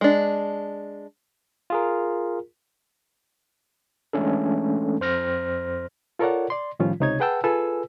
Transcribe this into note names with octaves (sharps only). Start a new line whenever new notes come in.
G#3 D4
F4 G#4 A#4
E3 G#3 A3 C#4 D4 A4
F2 C5 F6 A#6
F4 A4 A#4 C#5 D5 F#5
D5 C6
A2 D#3 F3 G3 C#4 F4
C#2 C3 D#4 C#5 G#6
G#4 B4 F#5 G5 A5 E6
F4 G#4 A4 B4 G#5 E6